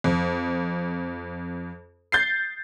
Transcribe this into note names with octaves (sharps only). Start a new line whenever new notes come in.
F2
G6 A6 C7